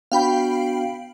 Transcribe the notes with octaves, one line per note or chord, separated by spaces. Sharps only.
B3 D4 F#4 F5 G5 B5